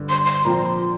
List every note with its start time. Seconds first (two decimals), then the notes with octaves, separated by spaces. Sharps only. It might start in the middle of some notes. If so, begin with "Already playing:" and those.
Already playing: G2 D3 G3
0.09 C6
0.25 C6
0.45 A#2 F3 C4 F4 A#5
0.66 C6